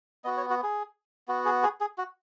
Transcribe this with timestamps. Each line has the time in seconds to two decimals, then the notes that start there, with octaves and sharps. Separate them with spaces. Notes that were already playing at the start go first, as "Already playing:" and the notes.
0.24 B3 F#4 D#5
0.37 C#5
0.50 F#4
0.63 G#4
1.28 B3 F#4
1.45 G#4
1.63 G#4
1.81 G#4
1.98 F#4